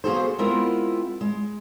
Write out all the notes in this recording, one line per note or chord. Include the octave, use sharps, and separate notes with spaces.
A#3 B3 F#4 G#4 A4 C5
G#3 B3 C4 E4 F4 A#4
G#3